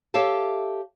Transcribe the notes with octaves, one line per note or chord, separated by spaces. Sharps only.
G4 A4 C#5 E5 F5 A5